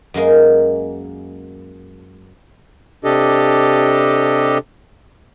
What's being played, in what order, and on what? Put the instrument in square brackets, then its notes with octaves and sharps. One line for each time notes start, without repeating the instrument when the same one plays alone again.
[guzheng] F#2 G#3 A#3 D#5
[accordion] C3 D4 G4 A4 D#5